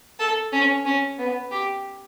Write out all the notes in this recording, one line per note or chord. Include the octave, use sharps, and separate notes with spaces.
A4
C#4
C#4
B3
G4